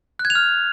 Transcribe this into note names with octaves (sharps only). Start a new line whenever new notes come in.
F#6
G#6
F7
F6